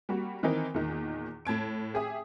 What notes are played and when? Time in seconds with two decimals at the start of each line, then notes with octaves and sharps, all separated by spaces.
0.09 G3 A#3 F#4
0.43 D#3 E3 C4 D#4 A#4
0.74 E2 A#2 D#3
1.45 A2 A5 G#6 D7
1.94 G4 G#4 E5 D#6